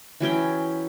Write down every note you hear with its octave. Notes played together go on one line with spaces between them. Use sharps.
E3 F#3 C#4 G5